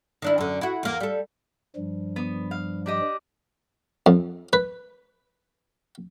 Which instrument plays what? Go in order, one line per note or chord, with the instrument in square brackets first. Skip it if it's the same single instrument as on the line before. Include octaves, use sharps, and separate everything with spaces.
[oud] D#3 D4 E4
F#2 D3
E4 F#4
E2 A#3
G3 A4
[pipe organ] G2 F3 G3
[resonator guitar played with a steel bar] B3
F5
D4 G4 D#5
[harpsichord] F2
B4